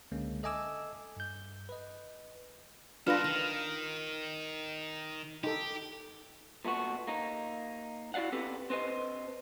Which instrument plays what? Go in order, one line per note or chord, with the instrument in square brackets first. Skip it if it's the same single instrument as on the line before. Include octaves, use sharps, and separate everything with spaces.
[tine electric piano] C#2 D3 G#3 A#3 C#4
A4 D#5 E5 G#5 D6 E6
G2 G6
B4 D#5
[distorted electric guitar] G3 A4 [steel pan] D4 F4 B4 [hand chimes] F6 A#6
[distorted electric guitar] D#3 [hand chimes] A#6
[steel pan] D#4 A4 [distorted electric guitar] G4
[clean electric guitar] A#2 A3 B3 F#4
A#3 D#4
E4 F#4 D5 F5 F#5
B3 C4 G4 A4 B4
C4 B4 C5 D#5